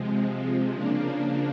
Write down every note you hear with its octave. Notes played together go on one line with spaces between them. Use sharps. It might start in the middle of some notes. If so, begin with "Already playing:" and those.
Already playing: C3 F3 G#3
C#3 F3 A#3 D4